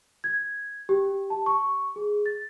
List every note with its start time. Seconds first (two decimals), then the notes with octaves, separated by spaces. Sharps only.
0.24 G#6
0.89 G4
1.30 A5
1.46 C#6
1.96 G#4
2.26 A6